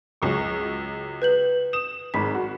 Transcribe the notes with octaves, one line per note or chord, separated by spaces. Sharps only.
C#2 F#3 C#6
B4 G6 F#7
D#6 E7
G#1 G#2 B5 B6
F#4